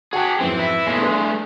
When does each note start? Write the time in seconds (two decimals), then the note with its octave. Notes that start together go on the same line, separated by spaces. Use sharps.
0.13 F#4 G#4 F#5 G5 A5
0.40 F2 G#2 E3 F#3 C4
0.59 E4
0.87 B1 G#3 A3
1.01 D4 G#4 B4